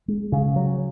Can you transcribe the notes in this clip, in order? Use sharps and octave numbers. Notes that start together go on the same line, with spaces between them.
G#3
C#3
F#3